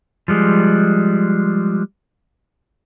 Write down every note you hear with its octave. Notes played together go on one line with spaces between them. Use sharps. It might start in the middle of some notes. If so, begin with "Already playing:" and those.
F3 G3 G#3